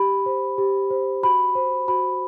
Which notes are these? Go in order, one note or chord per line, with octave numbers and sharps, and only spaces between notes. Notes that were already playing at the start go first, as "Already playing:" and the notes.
Already playing: G4 B5
C5
G4
C5
F#4 B5
C5
F#4 B5